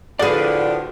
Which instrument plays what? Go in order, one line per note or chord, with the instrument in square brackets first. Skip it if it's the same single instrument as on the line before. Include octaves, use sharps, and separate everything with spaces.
[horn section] A2 D3 F3 [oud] F#4 G#4 [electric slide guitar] B4 D5